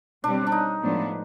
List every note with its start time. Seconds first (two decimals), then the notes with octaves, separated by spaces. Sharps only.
0.24 B2 G3 C4 D4
0.47 D4
0.52 D#4
0.82 A2 F3 G#3 B3 D4